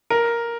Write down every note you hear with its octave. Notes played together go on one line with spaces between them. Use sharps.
A#4